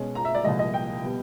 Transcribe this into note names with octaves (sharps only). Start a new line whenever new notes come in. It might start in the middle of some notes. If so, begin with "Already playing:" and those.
Already playing: B2 G#3 C#4
A#5
E5
D5
C2 A#2 F3 G#3 D#5
D#5
G5
B2 G3 B3